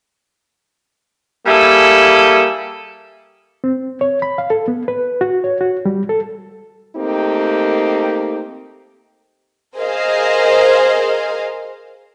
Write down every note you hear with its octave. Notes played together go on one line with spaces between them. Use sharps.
G3 A#3 E4 G#4 A4
C4
C#5
B5
F5
A4
B3
B4
F#4
C#5
F#4
G3
A4
A3 A#3 C4 D#4 G4
G#4 A#4 C5 D#5 F5